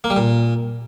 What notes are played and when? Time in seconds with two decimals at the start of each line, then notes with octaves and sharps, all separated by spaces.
0.04 A#3
0.10 G3
0.16 A#2